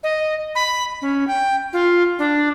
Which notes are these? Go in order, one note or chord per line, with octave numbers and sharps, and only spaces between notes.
D#5
B5
C#4
G5
F4
D4